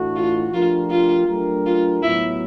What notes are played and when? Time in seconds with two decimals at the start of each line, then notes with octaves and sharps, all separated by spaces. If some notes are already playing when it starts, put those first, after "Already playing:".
Already playing: A2 E3 A3 D4 F#4
0.16 F4
0.53 F3 A3 D4 F4 G4 A#4
0.90 F4
1.28 F#3 A3 D4 G4 A#4
1.66 F4
2.03 A2 F#3 B3 E4